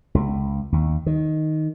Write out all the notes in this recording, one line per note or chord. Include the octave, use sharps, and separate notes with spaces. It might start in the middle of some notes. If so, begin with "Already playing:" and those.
C#2
D#2
D#3